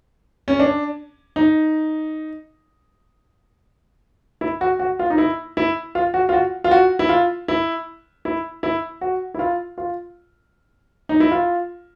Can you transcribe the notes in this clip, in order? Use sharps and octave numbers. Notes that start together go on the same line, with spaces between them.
C#4
D4
D#4
E4
F#4
F#4
F4
D#4
E4
E4
F4
F#4
F4
F#4
F4
F#4
E4
F4
E4
E4
E4
F#4
E4
F4
F4
D#4
E4
F4